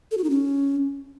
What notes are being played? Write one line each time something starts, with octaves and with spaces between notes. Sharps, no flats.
A4
F#4
D#4
C#4